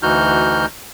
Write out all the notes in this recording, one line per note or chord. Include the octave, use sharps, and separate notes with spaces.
D2 E3 D#4 F#4 F6 G6